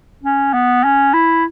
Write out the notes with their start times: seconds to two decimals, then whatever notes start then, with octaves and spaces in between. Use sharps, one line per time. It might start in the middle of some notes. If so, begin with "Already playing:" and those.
0.23 C#4
0.53 B3
0.84 C#4
1.13 E4